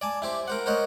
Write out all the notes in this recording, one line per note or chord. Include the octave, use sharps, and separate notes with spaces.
D5 G#5 A5
E4 G4 C5
A#4 C5 F#5
A#4 C5 C#5 D#5 F#5